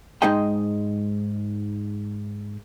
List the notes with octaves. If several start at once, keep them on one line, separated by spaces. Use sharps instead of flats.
G#2 G#3 D#4 G#4 D#5 G5